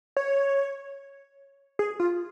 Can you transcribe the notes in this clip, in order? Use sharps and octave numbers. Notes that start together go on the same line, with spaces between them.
C#5
G#4
F4